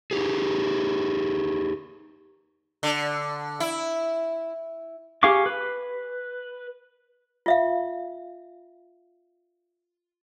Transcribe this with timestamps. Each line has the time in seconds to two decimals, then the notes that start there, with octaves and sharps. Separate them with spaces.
0.11 D#4 G4 G#4
2.83 D3
3.60 E4
5.23 G4 G#4 F5 C#6 D6
5.46 B4
7.46 F4 E5 F5